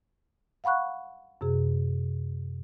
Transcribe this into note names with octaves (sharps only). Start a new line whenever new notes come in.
F5 F#5 B5 C#6 F#6
F#2 C3 G#4